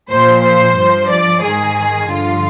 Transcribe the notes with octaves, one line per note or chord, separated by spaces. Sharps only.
A#2 F3 C5
C5
G2 F3
D5
G#2 D#3 G#4
G2 D3 F3 F4